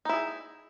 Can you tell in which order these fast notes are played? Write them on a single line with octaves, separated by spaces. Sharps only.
D#4 E4 G#4